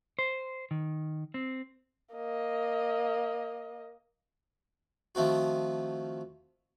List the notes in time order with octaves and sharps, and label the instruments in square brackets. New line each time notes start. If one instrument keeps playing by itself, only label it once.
[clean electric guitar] C5
D#3
C4
[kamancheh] A#3 D#5
[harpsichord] D#3 F3 A3 C4 F#4